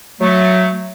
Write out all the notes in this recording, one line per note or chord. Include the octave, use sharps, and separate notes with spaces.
F#3 A3